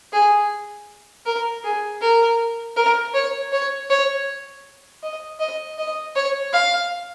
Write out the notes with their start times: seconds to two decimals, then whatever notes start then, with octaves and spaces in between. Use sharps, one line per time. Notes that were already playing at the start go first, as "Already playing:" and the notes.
0.13 G#4
1.26 A#4
1.64 G#4
2.01 A#4
2.76 A#4
3.14 C#5
3.52 C#5
3.90 C#5
5.03 D#5
5.39 D#5
5.78 D#5
6.16 C#5
6.53 F5